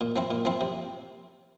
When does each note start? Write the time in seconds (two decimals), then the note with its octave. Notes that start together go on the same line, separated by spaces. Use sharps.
0.01 A#2
0.16 F3 C4 E4
0.31 A#2
0.45 F3 C4 E4
0.61 C3